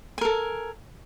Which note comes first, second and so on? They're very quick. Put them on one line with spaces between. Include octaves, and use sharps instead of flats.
G#5 A#4 A4